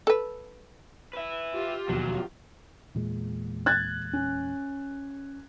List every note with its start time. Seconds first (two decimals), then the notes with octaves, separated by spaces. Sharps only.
0.07 A4 B4
1.13 B4 E5
1.53 F4 G4
1.89 E1 D#2 B2 F3 F#3
2.95 E2 A#2 G#3
3.66 F#6 G#6 A6
4.13 C#4